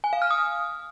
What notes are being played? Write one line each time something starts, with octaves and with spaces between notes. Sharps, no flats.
G#5
F5
F6
D#6